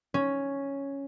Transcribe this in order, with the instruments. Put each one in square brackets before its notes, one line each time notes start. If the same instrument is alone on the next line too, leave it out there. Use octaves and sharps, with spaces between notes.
[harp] C#4